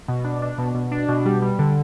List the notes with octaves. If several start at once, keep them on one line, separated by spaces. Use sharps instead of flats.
B2
D4
D4
B2
B2
D4
B2
G3
G3
D3